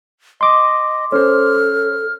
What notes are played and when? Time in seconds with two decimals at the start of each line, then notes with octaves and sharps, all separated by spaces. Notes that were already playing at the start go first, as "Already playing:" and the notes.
0.41 D#5 C6 D6
1.12 C#4 A4 C5 F6